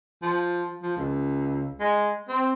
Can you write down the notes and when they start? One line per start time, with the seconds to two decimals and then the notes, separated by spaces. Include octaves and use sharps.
0.22 F3
0.83 F3
0.97 C#2
1.80 G#3
2.29 C4